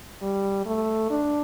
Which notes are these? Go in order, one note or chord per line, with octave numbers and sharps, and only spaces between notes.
G3
A3
D4